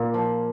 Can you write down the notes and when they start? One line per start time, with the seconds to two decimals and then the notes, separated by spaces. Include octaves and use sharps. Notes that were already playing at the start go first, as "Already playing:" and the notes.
Already playing: A#2 A#3
0.14 F3